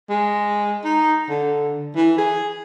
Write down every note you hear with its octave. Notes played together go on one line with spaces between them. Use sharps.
G#3
D#4
D3
E3
G#4